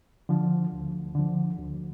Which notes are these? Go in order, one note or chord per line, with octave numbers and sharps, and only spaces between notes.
D3 F3
D2
D3 F3
D2